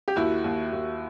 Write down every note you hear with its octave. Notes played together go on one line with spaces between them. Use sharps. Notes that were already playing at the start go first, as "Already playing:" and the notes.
G4
D#2 E4 F#4
D#2
D#2